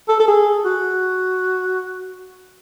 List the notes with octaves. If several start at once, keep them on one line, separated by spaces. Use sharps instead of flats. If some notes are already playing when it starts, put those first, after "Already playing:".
A4
A4
G#4
F#4